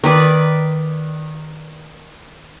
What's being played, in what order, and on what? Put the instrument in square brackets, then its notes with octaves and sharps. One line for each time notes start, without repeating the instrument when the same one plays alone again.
[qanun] D#3 B4 D5